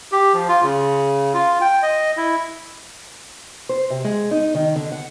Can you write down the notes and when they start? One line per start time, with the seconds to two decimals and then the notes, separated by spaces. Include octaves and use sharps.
0.12 G4
0.34 F3
0.48 F4
0.63 C#3
1.34 F4
1.61 G5
1.83 D#5
2.17 E4
3.69 C5
3.90 C3
4.04 G#3
4.31 D#4
4.55 D#3
4.76 D3
4.92 F#5